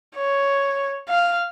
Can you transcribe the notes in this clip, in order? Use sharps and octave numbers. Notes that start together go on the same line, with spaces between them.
C#5
F5